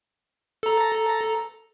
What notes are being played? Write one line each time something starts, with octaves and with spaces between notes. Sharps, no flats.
A4 A#5